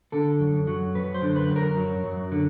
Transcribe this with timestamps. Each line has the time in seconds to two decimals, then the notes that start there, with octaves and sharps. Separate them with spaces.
0.12 D3 A4
0.40 F#2
0.67 F#3
0.95 F#2 B4
1.14 C5
1.22 D3
1.36 B4
1.49 F#2
1.56 A#4
1.77 F#3
2.04 F#2
2.32 D3